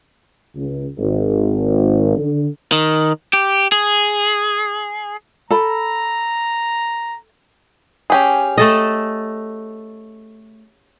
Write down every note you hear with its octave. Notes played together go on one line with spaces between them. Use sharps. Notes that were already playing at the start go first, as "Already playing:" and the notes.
C#2
G#1
D3
D#3
G4
G#4
A4 A#5 B5
C#4 G4 G#4
A3 A4 D#5